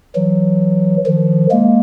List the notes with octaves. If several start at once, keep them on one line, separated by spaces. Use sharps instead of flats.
E3 F#3
D#3 F3
G#3 A#3